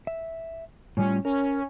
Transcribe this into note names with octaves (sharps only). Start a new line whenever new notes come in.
E5
A2 G3 C#4 F4
C#4 A#4